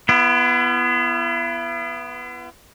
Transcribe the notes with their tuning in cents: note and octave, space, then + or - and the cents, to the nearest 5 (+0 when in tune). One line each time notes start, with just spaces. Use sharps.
B3 +0 E4 +45